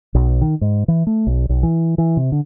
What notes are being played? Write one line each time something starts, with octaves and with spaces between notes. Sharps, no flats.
B1
D#3
G#2
E3
A3
B1
B1
E3
E3
C3
D3